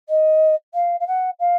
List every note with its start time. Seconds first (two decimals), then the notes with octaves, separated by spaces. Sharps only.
0.09 D#5
0.74 F5
1.00 F5
1.07 F#5
1.39 F5